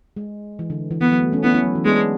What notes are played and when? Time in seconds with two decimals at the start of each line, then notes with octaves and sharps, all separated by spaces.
0.17 G#3
0.59 E3
0.70 D3
0.91 E3
1.01 E3 B3
1.12 F#3
1.22 A3
1.33 A3 C#4
1.44 B3 C#4 E4
1.54 C#4 E4
1.64 F#3
1.75 E3
1.85 G#3 B3 D4